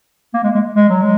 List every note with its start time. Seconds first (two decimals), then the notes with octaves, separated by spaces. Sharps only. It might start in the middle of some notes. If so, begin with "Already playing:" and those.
0.34 A#3
0.44 G#3
0.55 G#3
0.75 G#3
0.89 F#3
1.02 G#3